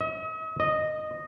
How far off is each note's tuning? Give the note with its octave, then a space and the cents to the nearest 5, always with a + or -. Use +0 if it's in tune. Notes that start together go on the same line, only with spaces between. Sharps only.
D#5 +45
D#5 -10